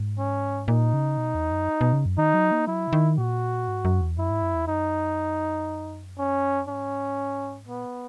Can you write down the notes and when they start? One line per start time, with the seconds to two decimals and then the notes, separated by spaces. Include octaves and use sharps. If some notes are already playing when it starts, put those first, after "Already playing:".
Already playing: G#2
0.19 C#4
0.68 A#2 D#4
0.94 C#3
1.17 B2
1.35 E2
1.51 F#2
1.81 B2
1.93 C#3
2.06 F#2
2.18 D#3 D#4
2.34 F#3
2.52 A#3
2.67 F#3 E4
2.88 C#3
2.93 D#3
3.18 A#2 F#4
3.68 G#2
3.85 F#2
4.01 E2
4.18 F#2 E4
4.30 G#2
4.42 F#2
4.55 E2
4.68 F#2 D#4
6.18 C#4
6.68 G#2 C#4
7.67 A#2 B3